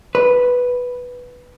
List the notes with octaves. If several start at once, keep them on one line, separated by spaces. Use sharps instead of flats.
B4